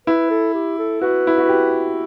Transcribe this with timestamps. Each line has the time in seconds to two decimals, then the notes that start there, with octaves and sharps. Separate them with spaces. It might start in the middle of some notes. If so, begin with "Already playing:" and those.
0.07 E4 B4
0.30 A4
0.54 G4
0.79 A4
1.01 F#4 B4
1.27 E4
1.38 F#4
1.49 G4